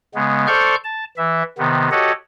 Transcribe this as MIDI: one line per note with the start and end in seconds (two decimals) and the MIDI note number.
0.15 0.47 49
0.15 0.47 56
0.15 0.47 59
0.47 0.75 69
0.47 0.75 72
0.47 0.75 74
0.47 0.75 85
0.47 0.75 89
0.47 0.75 91
0.84 1.04 81
1.17 1.43 52
1.17 1.43 76
1.58 1.89 48
1.58 1.89 51
1.58 1.89 59
1.91 2.12 66
1.91 2.12 67
1.91 2.12 69
1.91 2.12 73
1.91 2.12 75
1.91 2.12 78